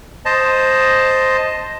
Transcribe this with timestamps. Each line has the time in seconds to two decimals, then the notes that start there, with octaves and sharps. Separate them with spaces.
0.25 C5 D#5 A5